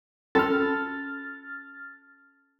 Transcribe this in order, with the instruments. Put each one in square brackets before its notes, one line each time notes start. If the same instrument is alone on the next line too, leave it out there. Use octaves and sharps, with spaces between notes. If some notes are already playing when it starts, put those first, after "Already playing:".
[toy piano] C#4 F4 F#4 [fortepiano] A4 [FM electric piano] F6 A6